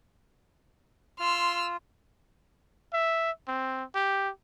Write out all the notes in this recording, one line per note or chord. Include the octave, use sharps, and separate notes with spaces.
F4 C6 E6 F6
E5
C4
G4